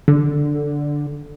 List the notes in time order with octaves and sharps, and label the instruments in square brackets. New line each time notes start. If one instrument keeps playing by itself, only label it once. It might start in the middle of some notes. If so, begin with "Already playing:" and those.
[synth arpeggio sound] D3